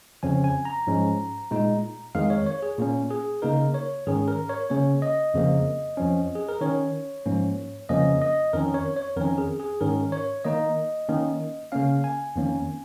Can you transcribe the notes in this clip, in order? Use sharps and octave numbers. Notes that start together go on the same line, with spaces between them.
F2 C#3 F3 C#4 G#5
G#5
A#5
G#2 F3 G#3 C#4
A#2 G#3 D#4
F2 D#3 G#3 F5
C#5
C#5
G#4
A#2 A#3 C#4
G#4
C#3 A#3 D#4 A#4
C#5
G#2 D#3 C#4 G#4
A#4
C#5
C#3 A#3 C#4 C#5
D#5
F2 C#3 F3 A#3
F2 F3 C#4
G#4
A#4
D#3 C#4 C#5
G#2 F3 A#3 C#4
F2 C#3 F3 A#3 C#4 D#5
D#5
F2 D#3 C#4 A#4
C#5
C#5
F2 D#3 C#4 A#4
G#4
G#4
G#2 D#3 C#4 A#4
C#5
D#3 A#3 D#4 D#5
D#3 A#3 C#4
C#3 A#3 C#4 F5
G#5
F2 D#3 A#3 C#4